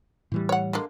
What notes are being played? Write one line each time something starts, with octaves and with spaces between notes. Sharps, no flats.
A2 E3 G3
C#5 F#5
D3 G#3 A#3